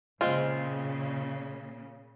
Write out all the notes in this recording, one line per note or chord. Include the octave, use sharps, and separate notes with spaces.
A#2 C#3 G#3 C4 F4